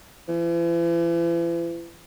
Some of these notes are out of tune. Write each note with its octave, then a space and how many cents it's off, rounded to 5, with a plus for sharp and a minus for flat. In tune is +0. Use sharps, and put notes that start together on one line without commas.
E3 +40